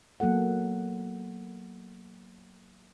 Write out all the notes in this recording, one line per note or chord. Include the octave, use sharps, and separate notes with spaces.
F#3 A#3 B3 A4 F#5